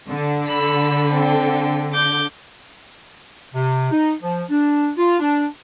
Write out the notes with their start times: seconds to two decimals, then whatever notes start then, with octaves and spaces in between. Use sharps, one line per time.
0.10 D3
0.48 B5 E6
1.11 C4 G5
1.93 D6 G6
3.54 C3
3.91 D#4
4.22 F3
4.50 D4
4.98 F4
5.20 D4